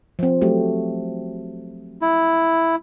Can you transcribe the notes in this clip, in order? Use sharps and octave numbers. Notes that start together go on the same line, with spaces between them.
F3 C4
F#3 A3 G4
E4